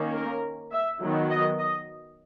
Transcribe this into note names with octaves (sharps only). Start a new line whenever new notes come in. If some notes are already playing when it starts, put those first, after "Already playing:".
Already playing: D#3 A#3 C#4
A#4
E5
D#3 F#3 B3
D#5
D#5